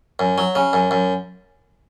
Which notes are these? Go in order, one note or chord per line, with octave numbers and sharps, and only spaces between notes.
F#2
F#3
C#3
F#2
F#2